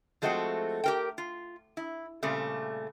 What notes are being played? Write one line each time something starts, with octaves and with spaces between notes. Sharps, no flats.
F3 G#3 A3 C4 F4 F#4
G4 A#4 G5
F4
E4
A#2 C#3 G3 A3 C4